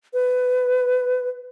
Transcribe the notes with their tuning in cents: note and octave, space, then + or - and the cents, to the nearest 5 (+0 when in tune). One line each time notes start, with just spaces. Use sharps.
B4 +20